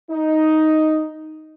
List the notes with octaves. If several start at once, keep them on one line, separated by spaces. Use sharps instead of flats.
D#4